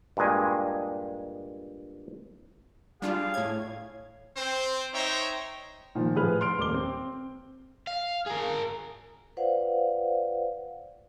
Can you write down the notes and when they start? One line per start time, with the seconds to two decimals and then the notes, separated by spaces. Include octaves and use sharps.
0.17 G2 A#2 G#3 G#5
3.02 G3 D4 F4 G#4 F5
3.34 A2 C#5 G#6
4.37 C4 C5
4.94 D#4 C5 C#5 E5 G5 A#5
5.95 A#2 D#3 F3
6.15 A2 F3 G#4 B4 F6
6.41 C6 F6 D7
6.58 D#1 A#3 D6 G7
6.74 C4
7.87 F5
8.27 G#4 A#4
9.37 F4 B4 C5 D5 F5 F#5